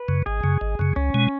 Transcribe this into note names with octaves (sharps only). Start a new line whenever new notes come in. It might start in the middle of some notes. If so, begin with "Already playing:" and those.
Already playing: B4
F#2 C#3
G#1 G#4
F#2 C#3
G#1
F#2 C#3
C#2 C#4
B2 G#3